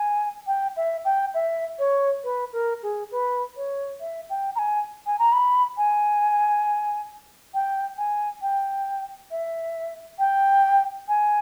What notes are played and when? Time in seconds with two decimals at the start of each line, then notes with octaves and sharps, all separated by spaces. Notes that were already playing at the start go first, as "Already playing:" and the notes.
Already playing: G#5
0.47 G5
0.77 E5
1.05 G5
1.34 E5
1.79 C#5
2.24 B4
2.53 A#4
2.83 G#4
3.12 B4
3.57 C#5
4.00 E5
4.30 G5
4.55 A#5
4.59 G#5
5.07 G#5
5.19 A#5
5.33 B5
5.78 G#5
7.54 G5
7.98 G#5
8.42 G5
9.31 E5
10.19 G5
11.08 G#5